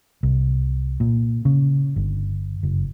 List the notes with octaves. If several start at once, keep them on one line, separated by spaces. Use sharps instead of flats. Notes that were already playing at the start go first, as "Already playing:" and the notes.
C2
A#2
C#3
G1
F#1